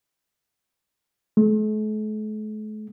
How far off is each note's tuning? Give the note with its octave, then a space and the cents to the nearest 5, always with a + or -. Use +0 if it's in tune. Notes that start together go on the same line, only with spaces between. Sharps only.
A3 -45